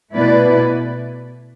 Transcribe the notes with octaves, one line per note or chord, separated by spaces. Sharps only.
B2 A3 E4 B4 D5